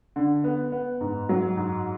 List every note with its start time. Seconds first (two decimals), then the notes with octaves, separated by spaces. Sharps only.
0.16 D3
0.44 B3
0.72 B3
1.01 G#2
1.29 F#3
1.57 G#2